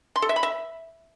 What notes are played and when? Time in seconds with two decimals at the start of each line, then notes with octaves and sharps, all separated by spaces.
0.16 C6
0.22 A4
0.29 E5
0.36 B5
0.43 E5